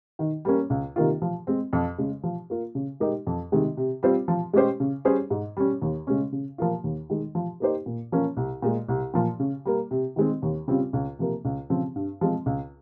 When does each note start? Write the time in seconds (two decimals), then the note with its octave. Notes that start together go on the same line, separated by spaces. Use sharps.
0.19 D#3
0.45 G3 A#3 C#4
0.70 C#2
0.96 C3 D#3 A#3 F4
1.22 F3
1.47 G#3 C4
1.73 F2
1.98 C#3 G#3
2.24 F3
2.50 A#3 F4
2.75 C#3
3.00 G#3 D#4 G4 A#4
3.27 F2
3.52 C3 D#3 G#3
3.77 C3
4.03 G3 C4 F4 C5
4.28 F3
4.53 G#3 C#4 G4 C5
4.80 C#3
5.05 G3 C#4 G#4 C5
5.30 G#2
5.57 G3 C#4
5.82 D#2
6.07 C#3 G#3 C#4
6.33 C#3
6.58 F3 A#3 F4
6.84 D#2
7.10 D#3 G#3
7.35 F3
7.60 A#3 D#4 G4 C5
7.86 A#2
8.12 F3 A#3 C#4
8.37 C2
8.62 A#2 G#3
8.88 C2
9.14 A#2 F3
9.40 C#3
9.65 G3 A#3
9.91 C3
10.16 D#3 G#3 C4
10.42 D#2
10.68 C#3 G3 C4 F4
10.93 C#2
11.19 C3 F3 A#3
11.45 C#2
11.70 C#3 F3 C4
11.96 G2
12.21 F3 G#3 C4
12.46 C#2